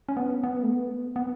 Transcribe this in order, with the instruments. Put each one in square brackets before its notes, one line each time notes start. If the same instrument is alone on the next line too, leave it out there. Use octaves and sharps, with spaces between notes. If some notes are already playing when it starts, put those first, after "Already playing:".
[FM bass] C#4
B3
B3
A3
B3
B3